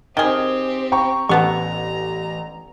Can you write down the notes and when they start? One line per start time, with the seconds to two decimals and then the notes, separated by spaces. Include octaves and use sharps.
0.17 D#3 C4 G4 G#4 G7
0.92 G5 A#5 C#6
1.29 A1 D3 B3 A#5 C#6